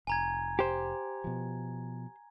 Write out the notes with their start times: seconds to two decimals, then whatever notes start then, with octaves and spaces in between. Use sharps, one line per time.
0.07 F1 G#5 A#5 G#6
0.59 G4 C5
1.24 B2 F3